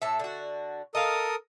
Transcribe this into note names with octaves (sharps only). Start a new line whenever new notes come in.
A2 A4 E5
D3 F#4
A4 A#4 D#5 F5 D#6